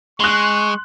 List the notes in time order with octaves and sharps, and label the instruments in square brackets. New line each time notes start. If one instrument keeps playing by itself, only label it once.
[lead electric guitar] G#3 [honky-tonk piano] C6 F#6 [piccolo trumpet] C#6